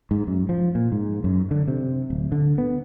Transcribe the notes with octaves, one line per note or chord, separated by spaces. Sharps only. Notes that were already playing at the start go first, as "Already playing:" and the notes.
G#2
F#2
F3
A#2
G#2
F#2
D3
C3
D1
D3
B3